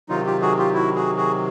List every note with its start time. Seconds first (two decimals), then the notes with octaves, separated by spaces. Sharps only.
0.09 C3 D#3 F#3 D#4 F4
0.26 F4 G4
0.42 F#4 G#4
0.58 F4 G4
0.74 E4 F#4
0.96 F#4 G#4
1.17 F#4 G#4